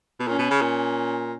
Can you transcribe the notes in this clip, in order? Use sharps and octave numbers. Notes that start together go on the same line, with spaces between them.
B2
A#2 C#4
B2
C#3
A#2